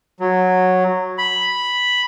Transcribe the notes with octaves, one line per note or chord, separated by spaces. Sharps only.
F#3
B5